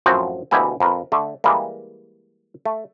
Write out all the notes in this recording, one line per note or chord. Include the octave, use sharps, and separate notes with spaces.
F#2 A2 F3 C4 F#4
D2 B2 A#3 E4 G4 G#5
F2 A#4 B4
D3 A3
E3 G3 G#3 A#3
A3